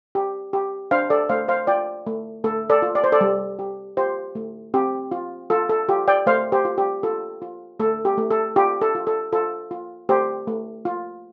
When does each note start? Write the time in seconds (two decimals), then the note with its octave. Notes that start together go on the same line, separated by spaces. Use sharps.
0.15 G4
0.53 G4
0.91 D4 C5 F5
1.10 A4 D5
1.29 A3 C5 F5
1.48 C5 F5
1.67 F4 D5 G5
2.07 A3
2.44 A3 A4
2.70 A4 D5
2.82 F4
2.95 D5
3.04 C5
3.12 A4 D5
3.21 G3
3.59 G4
3.97 F4 G4 C5
4.35 A3
4.74 C4 G4
5.11 F4
5.50 F4 A4
5.69 A4
5.89 F4 G4
6.08 D5 G5
6.26 A3 C5 F5
6.52 G4 C5
6.65 F4
6.78 G4
7.03 F4 A4
7.42 F4
7.80 A3 A4
8.05 G4
8.18 A3
8.31 A4
8.56 F4 G4
8.81 A4
8.95 F4
9.07 A4
9.32 F4 A4
9.71 F4
10.09 A3 G4 C5
10.47 A3
10.85 F4